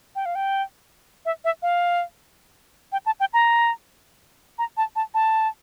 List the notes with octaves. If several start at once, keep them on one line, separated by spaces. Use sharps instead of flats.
G5
F5
G5
E5
E5
F5
G5
A5
G5
A#5
A#5
A5
A5
A5